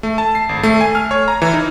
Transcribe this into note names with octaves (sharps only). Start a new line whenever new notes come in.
A3
A5
C7
G#1
A3
G#5
F6
C#5
A#5
E3
D#4